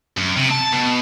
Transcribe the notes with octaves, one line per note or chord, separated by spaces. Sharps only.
F#2
C3
A5
B2